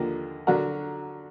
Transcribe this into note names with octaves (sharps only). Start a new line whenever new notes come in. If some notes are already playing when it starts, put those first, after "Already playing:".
Already playing: D#2 D3 F3 A#3
D3 F#3 D4 F#4 A#4